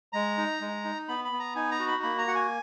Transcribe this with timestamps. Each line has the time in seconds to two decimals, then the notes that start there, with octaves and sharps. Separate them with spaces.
0.13 G#3 A#5
0.38 D#4
0.61 G#3
0.84 D#4
1.08 B3 B5
1.24 B5
1.32 B3
1.39 A#5
1.56 D#4 G#5
1.71 A#5
1.79 F#4
1.87 B5
2.03 A#3 B5
2.18 A#5
2.27 F#4 F#5
2.35 G#5